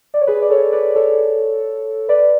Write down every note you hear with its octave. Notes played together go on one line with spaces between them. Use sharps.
D5
C#5
G#4 B4
D5
A4 C#5
B4 D5
A4 C#5
B4 D5